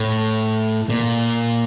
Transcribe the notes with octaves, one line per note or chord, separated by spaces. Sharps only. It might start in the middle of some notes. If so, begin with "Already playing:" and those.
Already playing: A2
A#2